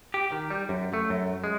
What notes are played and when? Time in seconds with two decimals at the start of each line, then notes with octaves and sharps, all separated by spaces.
0.14 G4
0.32 D#3
0.50 G3
0.69 F#2
0.94 A3
1.10 F#2
1.44 G#3